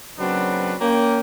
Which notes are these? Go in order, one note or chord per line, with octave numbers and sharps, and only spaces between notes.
C#3 F#3 A#3 C4 D4 B4
A#3 C#4 G5